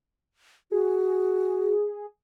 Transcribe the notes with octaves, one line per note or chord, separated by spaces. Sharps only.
F#4 G#4